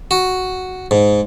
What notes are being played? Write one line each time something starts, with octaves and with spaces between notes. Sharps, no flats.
F#4
G#2